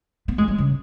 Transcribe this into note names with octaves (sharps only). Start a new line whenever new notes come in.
B3
G#3
F#3
C#3